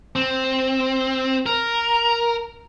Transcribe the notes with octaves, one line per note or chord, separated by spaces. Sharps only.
C4
A#4